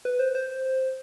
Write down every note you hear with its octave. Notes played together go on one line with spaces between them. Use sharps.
B4
C5
C5